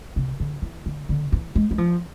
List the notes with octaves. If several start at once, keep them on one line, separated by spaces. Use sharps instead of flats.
C3
D3
E3
D3
D3
E3
G#3
G#3
F3